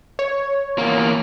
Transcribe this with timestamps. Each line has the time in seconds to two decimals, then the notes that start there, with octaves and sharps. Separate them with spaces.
0.19 C#5
0.78 E2 A#3